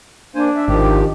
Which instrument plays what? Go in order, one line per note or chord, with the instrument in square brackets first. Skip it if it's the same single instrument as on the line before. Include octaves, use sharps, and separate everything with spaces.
[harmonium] A#3 C5 G#5 [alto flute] D4
[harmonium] E5
[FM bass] G#1 [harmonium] D#3 F3 G4